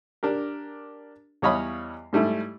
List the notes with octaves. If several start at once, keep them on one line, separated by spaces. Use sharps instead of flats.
D4 G4 A#4
E2 G3 C#5 D#5 F5 B5
G#2 G3 A3 E4